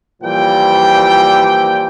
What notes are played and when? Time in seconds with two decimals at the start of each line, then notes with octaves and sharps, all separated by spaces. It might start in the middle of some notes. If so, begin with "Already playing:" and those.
0.23 A#2 E3 F3 G3 G5